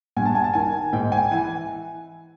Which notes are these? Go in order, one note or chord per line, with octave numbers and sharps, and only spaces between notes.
G2 G#5
A5
G#5
A5
D#3 G#5
G#2 G5
G#5
E3 G#5